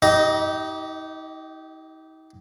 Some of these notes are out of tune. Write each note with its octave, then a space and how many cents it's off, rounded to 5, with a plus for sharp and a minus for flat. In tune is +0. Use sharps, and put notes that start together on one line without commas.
D#4 +40 G4 -20 D#5 +0